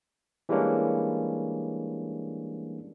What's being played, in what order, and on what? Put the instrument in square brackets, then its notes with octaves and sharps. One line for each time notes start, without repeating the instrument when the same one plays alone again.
[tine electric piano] E3 G3 G#3 A#3 C#4 D4